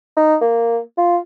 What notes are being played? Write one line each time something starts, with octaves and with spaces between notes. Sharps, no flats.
D#4
A#3
F4